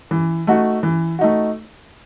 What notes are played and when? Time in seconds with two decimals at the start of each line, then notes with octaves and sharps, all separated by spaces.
0.11 E3
0.47 A3 D#4 F#4
0.83 E3
1.19 A3 D#4 F#4